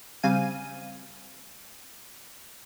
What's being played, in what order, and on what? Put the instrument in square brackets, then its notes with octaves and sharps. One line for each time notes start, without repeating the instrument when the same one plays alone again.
[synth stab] C#3 G3 C4 F5 G#5 D#7